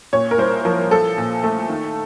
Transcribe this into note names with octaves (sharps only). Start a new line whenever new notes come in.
A#2 C#5
A#4
C2 C5
F3 A#4
F3 A4
A#2
A3
D#3